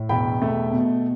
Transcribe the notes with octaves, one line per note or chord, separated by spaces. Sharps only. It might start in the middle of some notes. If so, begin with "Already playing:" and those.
Already playing: A2
E1 G5 B5
A3
B2